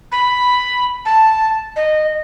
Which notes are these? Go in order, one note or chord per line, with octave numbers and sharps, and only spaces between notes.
B5
A5
D#5